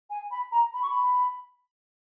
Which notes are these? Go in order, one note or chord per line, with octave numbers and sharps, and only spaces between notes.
G#5
B5
A#5
B5
C#6
B5